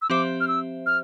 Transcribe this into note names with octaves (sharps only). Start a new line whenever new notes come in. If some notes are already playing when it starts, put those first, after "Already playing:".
E6
F3 C4 G4 C5 E5 D6
F6
E6
F6